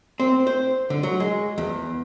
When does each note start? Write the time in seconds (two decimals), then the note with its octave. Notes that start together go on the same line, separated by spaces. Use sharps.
0.20 C4
0.47 C5
0.90 D3
1.03 F#3
1.20 G#3
1.58 E2